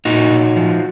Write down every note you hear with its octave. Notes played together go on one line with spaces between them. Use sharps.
A#2 D#4 F#4
A#2
F3